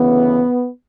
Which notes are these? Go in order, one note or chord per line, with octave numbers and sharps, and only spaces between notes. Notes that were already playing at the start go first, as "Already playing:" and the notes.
Already playing: D2 C#3 E3 B3